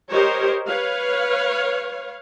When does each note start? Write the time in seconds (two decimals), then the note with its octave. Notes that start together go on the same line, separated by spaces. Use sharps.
0.11 G4 A#4 C5 C#5 D#5
0.69 B4 C#5 F5